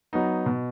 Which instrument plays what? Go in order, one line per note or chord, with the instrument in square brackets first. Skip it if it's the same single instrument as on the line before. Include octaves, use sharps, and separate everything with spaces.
[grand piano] F#3 B3 D#4
B2